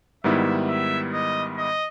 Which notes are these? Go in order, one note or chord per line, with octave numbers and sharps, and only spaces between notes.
G#2 D#3 G3 B3 E4 E5
E5
D#5
D#5